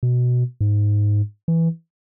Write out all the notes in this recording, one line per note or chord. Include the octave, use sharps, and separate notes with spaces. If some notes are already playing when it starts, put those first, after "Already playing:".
B2
G#2
E3